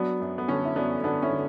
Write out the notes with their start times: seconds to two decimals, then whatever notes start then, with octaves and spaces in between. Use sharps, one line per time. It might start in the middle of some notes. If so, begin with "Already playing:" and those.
Already playing: F#3 B3 D4
0.20 F#2
0.38 B3
0.48 D3 C#4
0.65 E4
0.76 F#2 B3 D4
1.04 D3 B3 D4
1.22 C#4 E4
1.32 D3